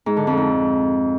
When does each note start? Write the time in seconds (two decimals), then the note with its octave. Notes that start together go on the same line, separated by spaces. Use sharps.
0.06 G#2
0.17 D3
0.27 F2
0.37 G#2